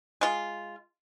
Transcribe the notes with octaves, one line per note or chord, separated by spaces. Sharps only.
G#3 F4